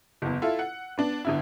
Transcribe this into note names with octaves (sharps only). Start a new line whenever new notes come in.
F#1 E2
E4 F4 A4
F#5
B3 D4
G1 D3 E4